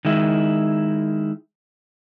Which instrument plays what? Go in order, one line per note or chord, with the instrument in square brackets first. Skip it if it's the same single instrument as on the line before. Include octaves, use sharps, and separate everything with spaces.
[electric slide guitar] D#3 G#3 E4